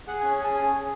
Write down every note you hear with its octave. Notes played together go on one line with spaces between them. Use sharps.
G#4 F#5
G#5
C#4
G#5
G#4 A5
G#4 G#5
G#4